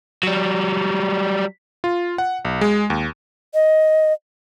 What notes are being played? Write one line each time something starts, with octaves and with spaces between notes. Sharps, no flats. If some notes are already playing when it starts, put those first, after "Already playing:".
F#3 G3
F4
F#5
B1
G#3
D#2
D#5